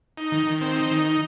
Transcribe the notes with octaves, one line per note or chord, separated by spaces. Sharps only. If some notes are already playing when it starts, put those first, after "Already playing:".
D#4
D#3
D#3
C4
D#4
D#3
D#4